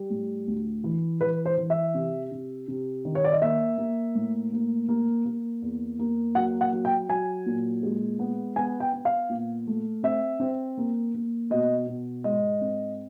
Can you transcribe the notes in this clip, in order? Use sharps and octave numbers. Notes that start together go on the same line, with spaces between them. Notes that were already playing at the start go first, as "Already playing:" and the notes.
Already playing: G3
A2
D2
E3
E3 B4
C5
E3
E5
C3
C3
C3
D#3
C#5
D5
D#5
A#3 E5
A#3
A2
A#3
A#3
A#3
E2
A#3
F#3 F#5
F#5
F#3
G5
F#3 G#5
A#2
G#3
B3
B3 G#5
G5
B3
F5
A#2
A3
C4 E5
C4
A#3
A#3
B2 D#5
B2
G#2 D#5
C4